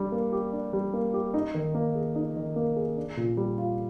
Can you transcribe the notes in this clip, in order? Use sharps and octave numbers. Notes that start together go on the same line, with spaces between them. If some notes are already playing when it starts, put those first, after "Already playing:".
Already playing: G3 D4
A#3
G4
D4
G3
A#3
G4
D#4
D#3
A#3
G#4
D#4
D#3
A#3
G#4
D4
A#2
G3
F4